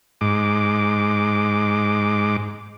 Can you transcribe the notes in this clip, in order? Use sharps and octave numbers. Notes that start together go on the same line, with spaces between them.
G#2 D6